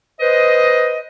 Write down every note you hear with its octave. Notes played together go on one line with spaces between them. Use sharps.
B4 C5 D#5